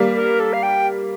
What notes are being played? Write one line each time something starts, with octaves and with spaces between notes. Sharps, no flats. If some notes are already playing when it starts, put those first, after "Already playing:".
Already playing: G3 A#3
A#4
A4
F5
G5